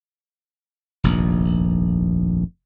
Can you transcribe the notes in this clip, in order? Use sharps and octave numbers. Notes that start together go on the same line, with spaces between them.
F1 A#1 D#2